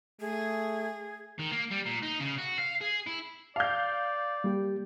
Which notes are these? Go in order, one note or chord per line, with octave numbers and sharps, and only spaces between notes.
A3 G#4
D#3
A#3
G3
A#2
D#4
C#3
F#4
F5
G#4
E4
D5 F5 G6
G3 A#3 G4